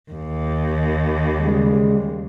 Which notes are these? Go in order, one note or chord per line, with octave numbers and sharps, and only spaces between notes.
D#2
C#3 G3 G#3